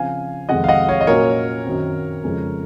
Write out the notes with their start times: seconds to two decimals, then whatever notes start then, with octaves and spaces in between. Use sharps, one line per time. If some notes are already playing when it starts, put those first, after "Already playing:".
Already playing: C#3 F3 C4 F5 G#5
0.49 F2 C3 D#3 G#3 D#5 F#5
0.64 F5
0.68 D#5 F#5
0.89 C#5 F5
1.01 D#5
1.07 A#2 F#3 C#4 A#4 C#5
1.66 F#2 D#3 F#3 C4
2.24 F2 C#3 F3 G#3 C#4